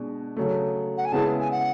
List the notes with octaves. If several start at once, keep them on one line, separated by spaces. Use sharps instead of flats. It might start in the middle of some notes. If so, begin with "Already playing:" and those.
Already playing: B2 G#3 D4
C#3 F#3 A3
F#5
G#5
C#3 G#3 B3 E4 G#4 A5
G#5
F#5